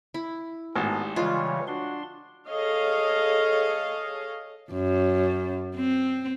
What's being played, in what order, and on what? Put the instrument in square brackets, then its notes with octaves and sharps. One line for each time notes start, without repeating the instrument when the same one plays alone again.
[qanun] E4
[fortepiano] G#1 A2 [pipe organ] B3 [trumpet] G4
[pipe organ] C#3 E3 G3 [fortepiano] G#3 [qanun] F4 [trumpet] C#5
[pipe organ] D4 C6 [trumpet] F#4
[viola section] G#4 A4 C#5 D#5 F5
[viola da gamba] F#2
C4